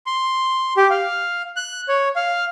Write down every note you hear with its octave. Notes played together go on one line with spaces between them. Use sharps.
C6
G4
F5
F#6
C#5
F5